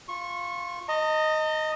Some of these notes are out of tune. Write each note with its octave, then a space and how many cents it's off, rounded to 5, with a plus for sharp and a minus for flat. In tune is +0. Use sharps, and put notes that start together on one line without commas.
F4 +0 C#6 -25
D#5 +0 A#5 -45